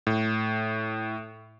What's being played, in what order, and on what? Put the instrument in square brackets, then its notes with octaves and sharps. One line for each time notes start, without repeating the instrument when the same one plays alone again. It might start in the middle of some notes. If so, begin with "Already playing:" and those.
[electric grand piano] A2